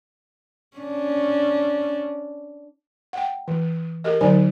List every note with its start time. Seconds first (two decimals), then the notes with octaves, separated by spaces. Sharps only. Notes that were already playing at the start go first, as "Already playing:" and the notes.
0.77 C#4 D4
3.13 F#5 G5
3.48 E3
4.04 G4 A4 A#4 D#5
4.21 D3 F#3 D#4 D5 G#5